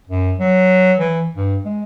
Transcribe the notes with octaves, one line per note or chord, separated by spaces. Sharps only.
F#2
F#3
E3
G2
G#3